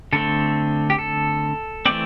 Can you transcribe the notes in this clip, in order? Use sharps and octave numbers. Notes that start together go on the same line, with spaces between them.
D3 A3 C4 A4
G4
A4
E3 A3 C4 D5